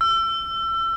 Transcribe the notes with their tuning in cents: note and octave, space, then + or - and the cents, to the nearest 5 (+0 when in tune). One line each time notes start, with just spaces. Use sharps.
E6 +30